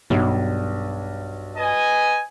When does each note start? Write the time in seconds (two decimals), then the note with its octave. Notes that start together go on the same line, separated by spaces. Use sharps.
0.10 B1 G2
1.57 B4 D#5 G#5